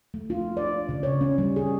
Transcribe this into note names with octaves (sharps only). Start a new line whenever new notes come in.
A3
F4
D5
C#3
C#5
C#4
G3
G#4